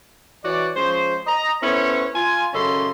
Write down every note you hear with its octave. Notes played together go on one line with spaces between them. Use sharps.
E3 F#4 C#5 D5
F3 G#3 C#4 C5
D#5 A#5
B3 C#4 E4 A4 C5 C#5
F4 G#5
F#2 C#3 C#4 A4 D#5 C6